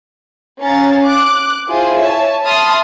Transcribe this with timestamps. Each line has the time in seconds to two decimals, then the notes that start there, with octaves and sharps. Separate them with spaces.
0.60 C#4 F5 A#5 A6
1.03 D6 F#6
1.68 E4 F4 G#4 C5 G5
2.00 C#5 E5 G#5 A5
2.44 E5 A5 B5 C6 D#6 F6